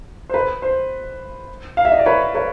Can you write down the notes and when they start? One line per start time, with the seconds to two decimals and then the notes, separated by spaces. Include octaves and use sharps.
0.29 C5
0.34 B4
0.62 C5
1.77 F5
1.85 E5
1.92 D#5
1.99 D5
2.06 B4 C#5
2.35 B4 C#5